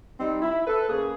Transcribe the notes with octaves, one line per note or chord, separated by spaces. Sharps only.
G3 C4 D#4
E4
A4 B4
C#3 A#3 G#4